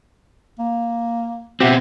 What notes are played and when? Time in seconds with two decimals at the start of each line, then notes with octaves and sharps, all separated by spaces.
0.59 A#3
1.60 B2 C4 G4 E5 F#5